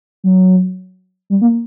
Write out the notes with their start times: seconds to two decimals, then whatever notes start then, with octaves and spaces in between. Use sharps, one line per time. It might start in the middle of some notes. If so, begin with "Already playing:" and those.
0.24 F#3
1.30 G3
1.41 A#3